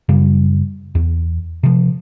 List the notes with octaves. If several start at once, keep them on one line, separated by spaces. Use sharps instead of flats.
F#2 C#3 G3
E2
C3 F3